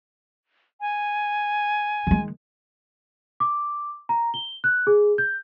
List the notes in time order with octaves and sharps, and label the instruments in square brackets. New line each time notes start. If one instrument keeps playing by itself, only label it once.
[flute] G#5
[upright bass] D#3 G#3
[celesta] D6
A#5
G7
F#6
G#4
G6